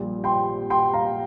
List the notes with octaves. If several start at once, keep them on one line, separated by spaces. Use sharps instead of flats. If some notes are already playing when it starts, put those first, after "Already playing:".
Already playing: A#1 A#2 G3
G5 C6
G5 C6
F5 A#5